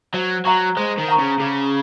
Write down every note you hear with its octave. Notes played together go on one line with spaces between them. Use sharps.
F#3 C5
F#3 F#5 A#5 C#6
G#3 C5
D#3
F#5 A#5 C#6
C#3
C#3 G#4